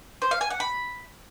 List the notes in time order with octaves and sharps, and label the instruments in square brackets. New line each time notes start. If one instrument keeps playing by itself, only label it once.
[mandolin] C5
F5
G#5
F#5
B5